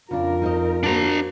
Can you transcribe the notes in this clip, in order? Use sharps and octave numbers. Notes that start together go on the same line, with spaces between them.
F2 C#3 D4 F4 A#4
D#4 C5 D#5
A#3 D4 F#4 C5 A#5